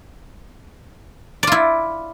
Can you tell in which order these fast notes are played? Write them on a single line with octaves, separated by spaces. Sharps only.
D5 F4 E4